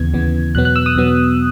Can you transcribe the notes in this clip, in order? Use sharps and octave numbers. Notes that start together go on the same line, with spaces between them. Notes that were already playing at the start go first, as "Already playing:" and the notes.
Already playing: D#2 C#3 E3 B3 G#6
D#2 C#3 E3 B3
E2 B2 F#3 B3 F#6
F#6
E6
D#6
E2 B2 F#3 B3